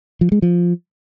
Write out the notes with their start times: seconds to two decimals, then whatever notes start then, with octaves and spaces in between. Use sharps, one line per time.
0.21 F3
0.32 G#3
0.42 F3